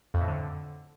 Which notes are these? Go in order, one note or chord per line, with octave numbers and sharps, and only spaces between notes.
F2
A2
D3